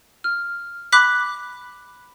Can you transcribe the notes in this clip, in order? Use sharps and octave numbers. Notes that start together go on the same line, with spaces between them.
F6
B5 D6 F#6 B6